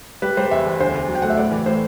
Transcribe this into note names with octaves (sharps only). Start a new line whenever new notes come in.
G3 B4
G3 C5
E2 E5
E2
D2 C5
D2
F#3
G5
A3 F#5
E5
A2 D5
E3
A2 C5